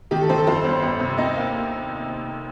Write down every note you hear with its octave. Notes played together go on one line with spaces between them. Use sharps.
D#3 G4
A4
D#3 C4 C5
A4
F2 C4 C5
G1
G1
C3
D#2 D#4 D#5
A#3